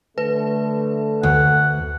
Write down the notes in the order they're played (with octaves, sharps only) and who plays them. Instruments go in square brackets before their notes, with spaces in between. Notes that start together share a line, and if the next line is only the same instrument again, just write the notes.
[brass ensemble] D3 A3 [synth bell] B4
[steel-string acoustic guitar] D2 [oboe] F#5